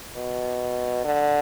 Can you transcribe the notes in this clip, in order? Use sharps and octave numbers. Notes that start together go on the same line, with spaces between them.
B2
D3